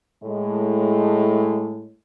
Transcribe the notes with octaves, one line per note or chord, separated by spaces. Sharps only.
A2 G#3